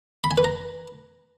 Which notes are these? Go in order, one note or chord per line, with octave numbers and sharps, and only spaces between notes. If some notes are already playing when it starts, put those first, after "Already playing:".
B5
G#5
B4
A#5